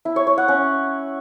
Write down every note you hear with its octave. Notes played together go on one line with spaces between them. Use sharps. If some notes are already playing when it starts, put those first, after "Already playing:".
E4
C#5
C#5
F#5
C#4